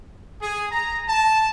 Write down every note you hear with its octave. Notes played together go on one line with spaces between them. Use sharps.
G#4
A#5
A5